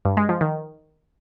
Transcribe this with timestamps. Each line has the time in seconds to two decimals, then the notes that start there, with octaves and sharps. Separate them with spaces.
0.05 G2
0.17 G#3
0.29 F3
0.41 D#3